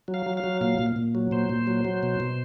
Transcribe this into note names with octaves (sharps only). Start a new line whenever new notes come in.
F#3
F5
F#3
F5
F#3
A#2 F5
A#2
A#2
F#3
A#2 C5
A#2
F#3
F#3
B2
B2